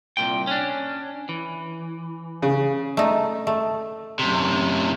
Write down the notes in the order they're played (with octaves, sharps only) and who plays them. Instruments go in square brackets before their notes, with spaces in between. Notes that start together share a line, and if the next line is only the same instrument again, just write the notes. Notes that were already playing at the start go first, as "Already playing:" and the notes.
[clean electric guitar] C2 A#2 G5
C#4 D4
E3
[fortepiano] C#3
[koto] A3 D#4
A3
[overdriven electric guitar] F#2 C3